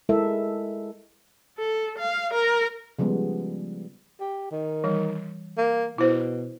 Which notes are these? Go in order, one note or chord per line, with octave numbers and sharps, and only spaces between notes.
G#3 E4 A4 A#4 E5
A4
F5
A#4
C#3 F3 G3 G#3 B3
G4
D#3
E3 G3
A#3
B2 E4 C5